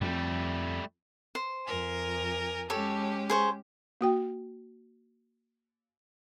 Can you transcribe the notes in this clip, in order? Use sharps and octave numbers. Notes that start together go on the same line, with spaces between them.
F2 G3 A3
C5
F2 A#4 G#5
G#3 C#4 G4 A4 C#5
G#4 C5 C#6
A#3 F#4 G5